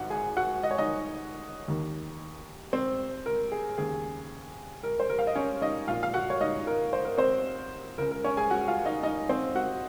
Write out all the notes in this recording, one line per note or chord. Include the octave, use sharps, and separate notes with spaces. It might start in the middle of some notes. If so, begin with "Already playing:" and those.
Already playing: G#1 G#2 F#4 F#5
G#4 G#5
F#4 F#5
D#5
C#5
D#4 D#5
D#2 D#3
C4 C5
A#4
G#4
D#2 C#3 G#4
A#4
C5
A#4
F5
D#5
C#4 C#5
D#4 D#5
A#1 A#2 F4 F5
F5
F#4 F#5
C#5
D#4 D#5
A#4
C5
A#4
C4 C5
C#2 C#3 A#4
A#4
C#4 C#5
G#4 G#5
F#4 F#5
F4 F5
D#4 D#5
D#4 D#5
C4 C5
F#4 F#5